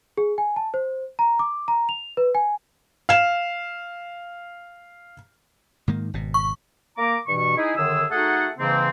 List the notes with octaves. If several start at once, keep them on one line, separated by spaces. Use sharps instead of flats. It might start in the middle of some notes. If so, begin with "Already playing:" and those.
G#4
G#5
A5
C5
A#5
D6
A#5
F7
B4
G#5
F5 E7
G#2 D#3 A#3
G#1 B2
C#6
A#3 A#5 D6
G2 B2 E3 C#6
D#4 E4 G#4
F#2 D3 D#3 G#4 E6
A3 D#4 F#4 G#4 A4 F#5
G#2 C#3 E3 A#3 C4